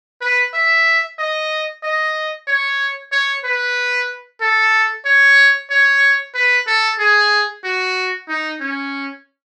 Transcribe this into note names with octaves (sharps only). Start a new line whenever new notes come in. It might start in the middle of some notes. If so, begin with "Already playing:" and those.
B4
E5
D#5
D#5
C#5
C#5
B4
A4
C#5
C#5
B4
A4
G#4
F#4
D#4
C#4